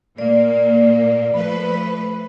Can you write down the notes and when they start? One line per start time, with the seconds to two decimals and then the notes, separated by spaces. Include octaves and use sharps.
0.18 A#2 A#3 D5
1.34 F3 A3 B4 B5